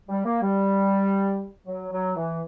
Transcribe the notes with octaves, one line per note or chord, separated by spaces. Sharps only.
G3
A#3
G3
F#3
F#3
E3